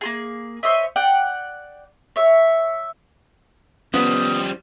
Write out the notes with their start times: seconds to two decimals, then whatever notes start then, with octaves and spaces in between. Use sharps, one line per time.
0.01 A#3 F4 G#4
0.63 C5 C#5 D#5 E5
0.96 D5 F#5 G5
2.16 C#5 E5
3.94 F3 G3 B3 C#4 D#6